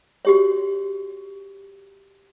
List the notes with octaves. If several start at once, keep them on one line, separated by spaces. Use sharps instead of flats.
F#4 G4 C#5